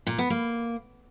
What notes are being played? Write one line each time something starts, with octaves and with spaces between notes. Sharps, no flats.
A#2
B3
A#3